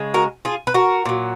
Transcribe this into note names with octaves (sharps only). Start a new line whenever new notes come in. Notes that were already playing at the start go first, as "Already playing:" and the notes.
Already playing: C#3 G#3
F#4 A#4
F4 G#4
B4
F#4 A#4
A#2 F#3